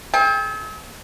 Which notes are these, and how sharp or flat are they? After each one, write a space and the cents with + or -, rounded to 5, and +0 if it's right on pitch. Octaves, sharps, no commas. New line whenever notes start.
A4 -45 G5 +35